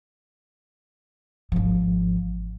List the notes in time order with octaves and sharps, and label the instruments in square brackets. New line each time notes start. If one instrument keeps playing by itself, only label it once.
[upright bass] G#1 F3